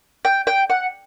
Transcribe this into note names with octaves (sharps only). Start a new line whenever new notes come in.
G5
G5
F#5